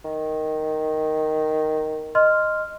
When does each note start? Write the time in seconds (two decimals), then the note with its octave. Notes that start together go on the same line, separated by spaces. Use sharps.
0.05 D#3
2.15 D#5 C6 F6